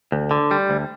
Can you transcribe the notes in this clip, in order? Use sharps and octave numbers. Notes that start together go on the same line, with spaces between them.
D2
D3
G3
D2